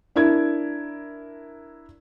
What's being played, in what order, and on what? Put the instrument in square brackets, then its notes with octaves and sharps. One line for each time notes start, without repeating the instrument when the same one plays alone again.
[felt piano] D4 E4 A#4 G#6